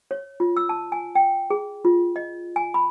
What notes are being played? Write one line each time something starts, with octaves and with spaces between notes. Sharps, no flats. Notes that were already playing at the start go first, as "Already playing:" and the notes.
C#5
F4
E6
A5
G#5
G5
G#4
F4
D#5
G#5
B5